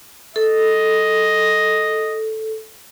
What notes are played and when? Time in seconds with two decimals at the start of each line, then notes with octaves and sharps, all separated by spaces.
0.36 A4 D#5